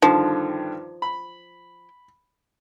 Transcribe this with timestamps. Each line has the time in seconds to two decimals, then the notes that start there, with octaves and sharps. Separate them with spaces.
0.02 G2 D3 D#3 F3
1.02 B5